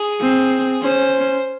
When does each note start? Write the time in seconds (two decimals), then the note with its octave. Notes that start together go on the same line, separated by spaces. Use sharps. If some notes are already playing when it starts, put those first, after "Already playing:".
Already playing: G#4
0.20 C4
0.81 C#4 C5